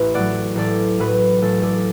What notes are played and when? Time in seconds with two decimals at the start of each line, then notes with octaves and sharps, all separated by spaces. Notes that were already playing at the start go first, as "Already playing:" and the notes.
Already playing: A1 B4 E5
0.14 A2 F#3 D5 F#5
0.56 A1 A4 D5
0.99 A2 F#3 B4
1.42 A1 A4
1.63 A4 D5